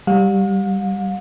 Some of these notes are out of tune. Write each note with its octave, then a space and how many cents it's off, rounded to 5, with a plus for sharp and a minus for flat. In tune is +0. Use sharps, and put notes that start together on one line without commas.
G3 +0 F5 +45